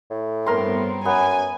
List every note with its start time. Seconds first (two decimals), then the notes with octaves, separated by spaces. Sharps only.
0.10 A2
0.46 G2 B3 C4 A#4 C6
1.05 F#2 B3 G#5